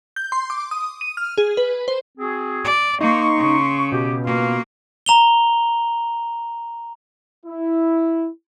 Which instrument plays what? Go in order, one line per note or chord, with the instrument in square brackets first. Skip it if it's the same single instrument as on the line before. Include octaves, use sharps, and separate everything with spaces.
[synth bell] G6
C6
D6
D#6
D#7
F6
G#4
B4
C5
[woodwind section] C4 F#4 G#4
[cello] D5
[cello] A#3 [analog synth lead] D#4 [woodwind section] C6 C#6
[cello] C#3
[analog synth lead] B2 [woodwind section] G4
[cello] A#3 [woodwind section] F4 F#4 F5
[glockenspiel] A#5 F7 G7
[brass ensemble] E4